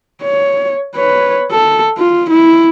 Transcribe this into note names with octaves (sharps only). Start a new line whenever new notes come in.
C#5
B4 C#5
A4
F4
E4